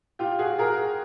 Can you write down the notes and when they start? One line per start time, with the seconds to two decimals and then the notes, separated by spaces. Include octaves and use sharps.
0.19 F4 G4
0.39 F#4 G#4
0.58 G#4 A#4